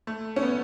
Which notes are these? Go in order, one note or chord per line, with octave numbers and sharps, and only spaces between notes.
A3
C#4
B3